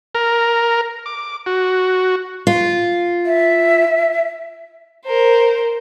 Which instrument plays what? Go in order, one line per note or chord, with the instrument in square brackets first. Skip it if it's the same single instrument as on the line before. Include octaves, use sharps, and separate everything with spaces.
[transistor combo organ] A#4
D6
F#4
[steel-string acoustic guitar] F4
[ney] E5
[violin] A#4 C5